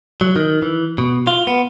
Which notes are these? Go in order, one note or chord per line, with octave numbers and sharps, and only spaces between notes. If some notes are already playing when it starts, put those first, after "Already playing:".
F#3
D#3
E3
B2
F4
B3